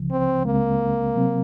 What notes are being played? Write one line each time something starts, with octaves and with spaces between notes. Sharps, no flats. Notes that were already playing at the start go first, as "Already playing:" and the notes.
Already playing: C#2 C#3 F3
C4
C#2 C#3 G#3 A#3 C4
C3 F#3 C4